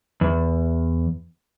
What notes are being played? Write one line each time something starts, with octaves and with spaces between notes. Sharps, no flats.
E2